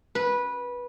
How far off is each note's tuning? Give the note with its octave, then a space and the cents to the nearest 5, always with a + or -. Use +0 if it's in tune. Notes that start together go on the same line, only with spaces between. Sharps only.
B4 -15